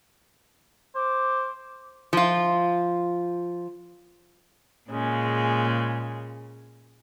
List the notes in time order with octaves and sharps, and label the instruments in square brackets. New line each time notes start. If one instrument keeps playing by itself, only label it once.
[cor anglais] C5 [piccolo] D6
[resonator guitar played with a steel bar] F3 F4
[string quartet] A#2 C#3 G#3